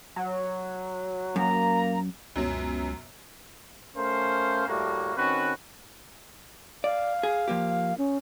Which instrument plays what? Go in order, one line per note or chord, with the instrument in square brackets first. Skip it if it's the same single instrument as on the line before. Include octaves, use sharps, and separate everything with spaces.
[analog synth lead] F#3
[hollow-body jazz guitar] F#2 [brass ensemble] A#3 [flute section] A#5
[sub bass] C#2 [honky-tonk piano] F#2 B2 F#3
[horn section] A3 C#4 A#4 C5 F5
A2 G3 A3 A#3 F#4
D#3 C4 C#4 F#4 B4
[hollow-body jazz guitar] D5 [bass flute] F5
[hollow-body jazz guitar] G#4
F3 A#3 G4
[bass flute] C#4